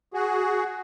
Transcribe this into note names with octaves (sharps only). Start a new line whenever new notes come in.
F#4 G#4